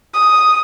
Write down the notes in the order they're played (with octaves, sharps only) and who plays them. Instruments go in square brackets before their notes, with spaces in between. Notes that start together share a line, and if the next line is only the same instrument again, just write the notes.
[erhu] D#6